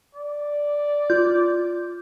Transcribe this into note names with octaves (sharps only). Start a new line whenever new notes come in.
D5
F4 G6